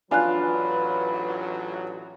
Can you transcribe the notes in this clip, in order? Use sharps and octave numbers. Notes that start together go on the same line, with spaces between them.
A1 F#3 D4 F4 B4 G#5 F#6